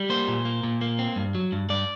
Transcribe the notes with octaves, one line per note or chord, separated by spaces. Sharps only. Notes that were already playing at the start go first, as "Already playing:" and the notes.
Already playing: G3
A#3 C5
A#2
A#3
A#2
A#3
C4
G2
F#3
G2
G2 D5